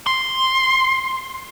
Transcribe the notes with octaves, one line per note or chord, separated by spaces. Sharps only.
C6